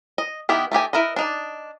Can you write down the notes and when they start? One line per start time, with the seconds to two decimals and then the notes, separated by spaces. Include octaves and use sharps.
0.18 D#5
0.49 D#3 B3 E4 G4
0.72 A3 D#4 G4 G#5
0.93 E4 A#4 B4 D#5
1.16 D4 D#4 D5